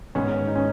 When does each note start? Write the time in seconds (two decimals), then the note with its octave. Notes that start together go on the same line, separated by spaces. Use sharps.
0.15 G#2 D#3 G#3 B3 C#4
0.47 D#4
0.56 C#4